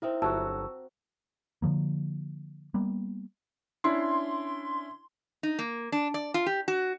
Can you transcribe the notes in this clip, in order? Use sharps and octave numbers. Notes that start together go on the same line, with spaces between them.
C4 D#4 E4 A#4 E5
G1 F#3 F#4 A5 C#6 E6
D3 D#3 F3 A#3
G3 A#3 B3
C#4 D4 E4 C6
D#4
A#3
D4
D5
F4
G4
F#4